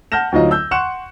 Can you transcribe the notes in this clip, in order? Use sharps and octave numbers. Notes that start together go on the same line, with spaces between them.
F#5 A5 F6 G6 A#6 E7
D2 F#3 D#4 F4 D#5 A#5
E6 G6
F#5 C6 C#6 F#6 C#7 E7